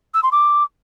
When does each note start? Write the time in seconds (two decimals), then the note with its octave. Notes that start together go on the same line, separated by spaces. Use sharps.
0.14 E6
0.23 C6
0.32 D6